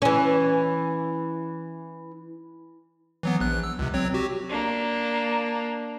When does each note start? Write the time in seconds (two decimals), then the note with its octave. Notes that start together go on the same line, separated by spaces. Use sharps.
0.02 E3 C#4
3.23 E3 F#3 B3
3.40 A#1 F#6
3.64 E6
3.79 C#2 C3
3.94 F#3 C4 C#5
4.14 F#4 G4
4.50 A#3 D4